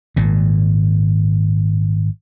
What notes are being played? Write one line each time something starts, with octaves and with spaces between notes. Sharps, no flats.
G#1 A#2